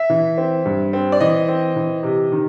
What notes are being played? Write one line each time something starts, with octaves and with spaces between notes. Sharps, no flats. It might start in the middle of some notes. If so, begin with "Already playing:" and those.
Already playing: E5
E3
C4
G2
C4
D5
E3 D#5
C4
E3
C3
D#3